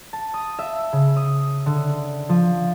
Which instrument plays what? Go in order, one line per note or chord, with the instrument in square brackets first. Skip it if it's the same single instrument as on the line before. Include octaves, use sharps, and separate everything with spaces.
[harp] A5
D#6
E5
C#3
D#6
D3
F3